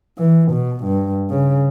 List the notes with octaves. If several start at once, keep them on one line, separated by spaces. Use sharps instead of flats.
E3
B2
G2
C#3